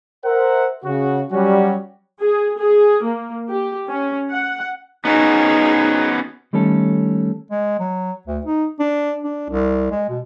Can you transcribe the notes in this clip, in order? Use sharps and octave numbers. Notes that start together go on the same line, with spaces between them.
A#4 C5 E5 F#5
C#3 F#4
F#3 G3 C#4 F#4
G#4
G#4
A#3
G4
C#4
F#5
B3 C#4 D#4 F#4 G#4
D#3 G3 A3 C#4 A4
G#3
F#3
D2
D#4
D4
D4
C2
G#3
B2